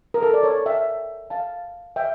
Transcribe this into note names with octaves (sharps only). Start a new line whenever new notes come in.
A#4
A4
D5
A4 C#5
E5 G5
F5 A5
E5 G5